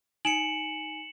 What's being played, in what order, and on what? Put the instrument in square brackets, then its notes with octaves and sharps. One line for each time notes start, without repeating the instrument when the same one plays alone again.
[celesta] D#4 G#5 D7 [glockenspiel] C#7 E7 F#7